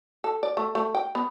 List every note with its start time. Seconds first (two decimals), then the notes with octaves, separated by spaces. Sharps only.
0.24 A4
0.43 D5
0.57 A3
0.75 A3
0.95 G5
1.15 B3